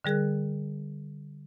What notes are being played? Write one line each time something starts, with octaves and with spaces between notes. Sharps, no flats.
D3 G3 G#4 A#4 F#6